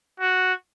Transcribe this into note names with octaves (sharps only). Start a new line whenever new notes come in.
F#4